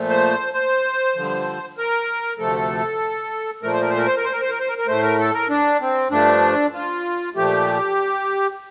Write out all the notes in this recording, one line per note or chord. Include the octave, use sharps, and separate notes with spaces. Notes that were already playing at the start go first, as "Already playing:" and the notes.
Already playing: A#2 F3 A3
C5
C5
G2 D3 F3
A#4
D2 C3 F3 A3 A4
A#2 F3 A3 A#4
C5
A#4
C5
A#4
C5
A#4
C5
A#4
C5
A#4
C5
A#4
A#4
A2 A3 C5
A#4
A4
A#4
D4
C4
G2 F3 A3 D4
F4
A#2 F3 A3 G4